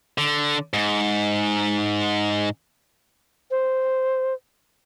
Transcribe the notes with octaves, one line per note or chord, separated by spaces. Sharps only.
D3
G#2
C5